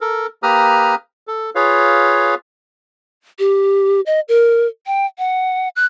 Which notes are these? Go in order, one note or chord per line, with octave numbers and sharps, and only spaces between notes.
A4 A#4
A#3 G4 B4 A#5 D#6 F6
A4
F4 G#4 B4 C#5 F5
G4
D#5
A#4
G5
F#5
F#6